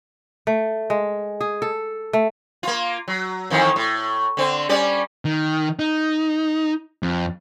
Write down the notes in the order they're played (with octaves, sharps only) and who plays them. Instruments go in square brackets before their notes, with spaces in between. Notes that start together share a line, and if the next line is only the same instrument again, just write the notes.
[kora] A3
G#3
G#4
A4
A3
[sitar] A#3 F4
F#3
F2 D#3 E3
A2
D3 C4
G3 C#4 D5
[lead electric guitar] D#3
D#4
F2